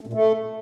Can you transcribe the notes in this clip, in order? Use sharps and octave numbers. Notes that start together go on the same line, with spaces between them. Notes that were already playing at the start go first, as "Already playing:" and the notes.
A3
A#2
A3